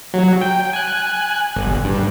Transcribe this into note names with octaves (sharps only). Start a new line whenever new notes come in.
F#3
G5
G#5 F#6
G1
G2